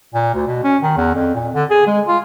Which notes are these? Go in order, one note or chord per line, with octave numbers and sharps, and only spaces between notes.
A#2
D2
B2
C#4
D#3
E2
F2
A#2
D3
G#4
G#3
F4